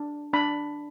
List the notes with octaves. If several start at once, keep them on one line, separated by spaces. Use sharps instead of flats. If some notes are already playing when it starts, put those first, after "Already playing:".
Already playing: D4
D4 B5